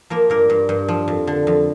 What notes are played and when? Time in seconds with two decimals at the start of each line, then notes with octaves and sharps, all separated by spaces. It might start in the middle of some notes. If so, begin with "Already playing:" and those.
0.10 F3 A#3 A#4
0.30 G2 A#3 A#4
0.50 G2
0.69 G2
0.88 F3
1.08 F2
1.27 D3
1.47 F2